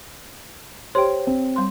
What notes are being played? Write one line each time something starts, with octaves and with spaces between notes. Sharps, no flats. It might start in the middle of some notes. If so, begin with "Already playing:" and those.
G4 C5 C#5 G5 C6
C4
G3 C6